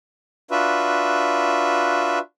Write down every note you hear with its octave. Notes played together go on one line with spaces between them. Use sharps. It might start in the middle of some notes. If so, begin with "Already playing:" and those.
D4 F4 F#4 B4 E5